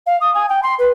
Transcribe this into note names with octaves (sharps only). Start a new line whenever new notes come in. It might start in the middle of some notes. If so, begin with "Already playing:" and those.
F5
D#6
G#5
G5
C6
B4